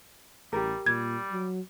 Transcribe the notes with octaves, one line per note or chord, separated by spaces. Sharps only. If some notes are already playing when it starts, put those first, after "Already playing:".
A1 G3 G4 A#4
A#2 G3 G#6
F#3